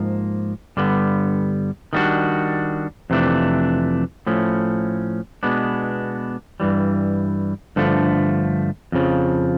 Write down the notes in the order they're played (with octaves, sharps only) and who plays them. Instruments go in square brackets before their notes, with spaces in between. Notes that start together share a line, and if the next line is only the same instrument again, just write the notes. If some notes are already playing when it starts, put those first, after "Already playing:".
Already playing: [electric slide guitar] G#2 F3 A#3
G2 D3 G3 B3
D#3 G3 A#3 D4 F#4
F2 C3 E3 A3 D4
A2 F3 A3 C#4
B2 G#3 B3 D4
G2 E3 G3
G2 D3 F3 A3
F2 C#3 F3